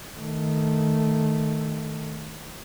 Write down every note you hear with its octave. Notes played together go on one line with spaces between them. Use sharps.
D#3 A3